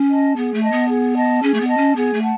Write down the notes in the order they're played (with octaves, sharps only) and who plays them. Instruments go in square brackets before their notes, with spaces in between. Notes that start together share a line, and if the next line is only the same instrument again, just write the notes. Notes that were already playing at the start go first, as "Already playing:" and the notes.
Already playing: [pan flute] C#4
[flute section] D#5 A5
[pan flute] B3 [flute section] G#4
[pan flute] A3
[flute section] D#5 A5
[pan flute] B3
[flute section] G#4
D#5 A5
[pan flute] C#4 [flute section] G#4
[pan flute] A3
B3
[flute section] D#5 A5
[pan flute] C#4
[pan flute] B3 [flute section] G#4
[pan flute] A3
[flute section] F#5 A5